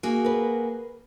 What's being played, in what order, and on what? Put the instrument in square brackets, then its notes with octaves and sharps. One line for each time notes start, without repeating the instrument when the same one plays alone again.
[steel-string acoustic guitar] A#3 F#4 G#4
[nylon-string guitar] A#4 B4